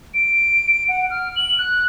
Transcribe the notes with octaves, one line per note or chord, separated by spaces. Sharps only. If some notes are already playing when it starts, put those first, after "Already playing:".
D7
F#5
F6
F#7
F#6